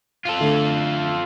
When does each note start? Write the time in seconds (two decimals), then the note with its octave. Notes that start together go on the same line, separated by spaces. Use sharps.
0.26 F4 A4
0.40 D3 A3